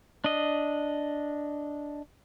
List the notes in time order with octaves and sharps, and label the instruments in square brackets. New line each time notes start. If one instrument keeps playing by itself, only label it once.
[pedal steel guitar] D4 D#5